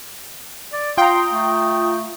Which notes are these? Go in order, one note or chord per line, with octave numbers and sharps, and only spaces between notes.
D5
F4 G5 A#5 C6 D#6
A3